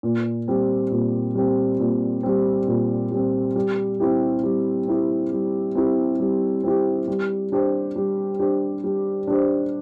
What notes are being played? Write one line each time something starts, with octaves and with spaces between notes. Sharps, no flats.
A#2
G3 C4
A#2
G3 C4
A#2
G3 C4
A#2
G3 C4
G3
C4 E4 G4
G3
C4 E4 G4
G3
C4 E4 G4
G3
C4 E4 G4
G3
D4 G4 C5
G3
D4 G4 C5
G3
D4 G4 C5